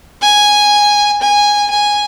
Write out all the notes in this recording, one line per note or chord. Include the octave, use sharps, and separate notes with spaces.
G#5
G#5
G#5